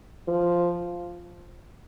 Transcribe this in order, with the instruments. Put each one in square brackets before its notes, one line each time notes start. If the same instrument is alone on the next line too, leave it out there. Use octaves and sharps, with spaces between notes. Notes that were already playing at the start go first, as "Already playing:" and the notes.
[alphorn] F3